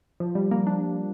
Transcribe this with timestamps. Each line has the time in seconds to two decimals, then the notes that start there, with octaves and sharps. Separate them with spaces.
0.20 F3
0.35 G3
0.51 A#3
0.67 D4